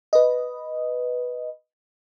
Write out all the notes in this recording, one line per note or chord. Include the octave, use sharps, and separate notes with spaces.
B4 D#5